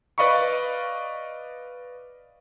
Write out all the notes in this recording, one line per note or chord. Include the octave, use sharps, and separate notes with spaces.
B4 D5 D#5 F5 B5 C#6